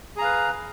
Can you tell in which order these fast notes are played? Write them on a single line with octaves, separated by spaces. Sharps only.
G#4 A#5 F5 B4